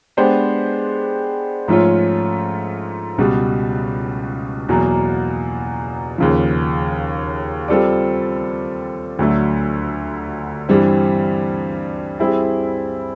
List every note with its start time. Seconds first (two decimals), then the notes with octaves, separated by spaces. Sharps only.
0.17 G#3 B3 D4 G4 C5
1.68 G#2 F3 A3 C#4 F4
3.18 C#2 B2 G3
4.69 E2 B2 F#3 A#3
6.18 D#2 C#3 F3
7.68 G3 C4 F4 A4 D5
9.19 D2 D3 F#3 A3
10.69 G2 E3 G3 C4
12.19 G3 C4 E4 G#4